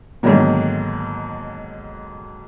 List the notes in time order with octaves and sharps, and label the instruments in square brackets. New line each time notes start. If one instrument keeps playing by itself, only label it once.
[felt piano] G#2 B2 D3 D#3 F#3 A#3